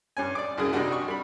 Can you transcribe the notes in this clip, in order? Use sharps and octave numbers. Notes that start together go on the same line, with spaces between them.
G2 C#4 G#5
D5 D6
C2 F#2 C#3 G#4 D#6
C3 G3 D4 D#4 F#4
C#6
G3 B5